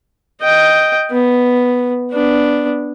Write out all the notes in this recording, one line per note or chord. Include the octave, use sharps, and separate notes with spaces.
D#5 G5
B3
B3 D4